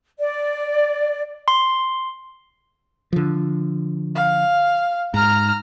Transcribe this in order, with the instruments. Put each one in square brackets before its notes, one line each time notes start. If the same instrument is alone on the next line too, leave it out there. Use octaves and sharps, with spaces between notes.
[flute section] D5
[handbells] C6
[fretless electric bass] D3 F3
[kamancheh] F5
[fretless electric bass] G#2 [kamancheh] A#5 F6